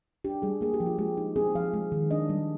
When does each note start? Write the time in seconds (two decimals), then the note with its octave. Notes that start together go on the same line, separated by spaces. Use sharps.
0.25 D4 G4
0.42 G3 G#4
0.61 A#3 G#4
0.74 G4
0.80 F3
0.86 F4
0.98 G#3 G4
1.17 D#4
1.36 C4 G#4
1.55 F3 F5
1.74 G#3
1.92 D#3
2.11 D4 D#5
2.29 G3